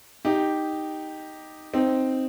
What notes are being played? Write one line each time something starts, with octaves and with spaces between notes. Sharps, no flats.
D#4 G4
C4 D#4